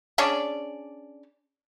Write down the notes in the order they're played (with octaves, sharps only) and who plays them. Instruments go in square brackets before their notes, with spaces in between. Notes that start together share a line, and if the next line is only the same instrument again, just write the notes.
[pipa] C#4 D4 G#4 D5